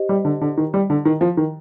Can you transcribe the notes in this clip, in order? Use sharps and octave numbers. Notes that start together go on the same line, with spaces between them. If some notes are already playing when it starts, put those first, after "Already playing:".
Already playing: G4 C5 D#5
G3
D3
D3
D#3
G3
D3
D#3
F3
D#3